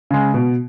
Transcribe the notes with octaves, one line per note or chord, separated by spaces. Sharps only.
C#3 G#3
B2